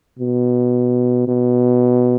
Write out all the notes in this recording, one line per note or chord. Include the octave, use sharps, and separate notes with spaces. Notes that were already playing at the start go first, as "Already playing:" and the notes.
B2
B2